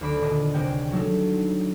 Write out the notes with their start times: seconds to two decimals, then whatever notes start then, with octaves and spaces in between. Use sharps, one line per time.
0.01 D2 D4 B5 D6
0.21 D#1 D4 D#5
0.54 C#2 C3 D5 G5
0.92 F#3 G3 A3 D4 D#4